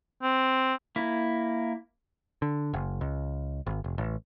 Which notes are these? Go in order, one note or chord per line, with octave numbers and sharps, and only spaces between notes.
C4
A#3 E4
D3
F#1
C#2
G#1
F1
A1